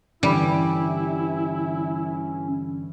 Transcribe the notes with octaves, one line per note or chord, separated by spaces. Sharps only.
G2 D3 E3 G3 C#4 E4